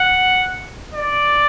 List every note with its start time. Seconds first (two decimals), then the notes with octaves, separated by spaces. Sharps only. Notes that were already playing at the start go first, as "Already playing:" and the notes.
Already playing: F#5
0.94 D5